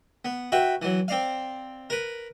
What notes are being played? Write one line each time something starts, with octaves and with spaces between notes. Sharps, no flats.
B3
F#4 B4 E5 G5
E3 F#3
C4 D5 F5
A#4 B4